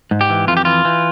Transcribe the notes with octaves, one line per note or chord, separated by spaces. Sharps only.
G#2
G4
E3
F2 F4
G4
E3 F4
E3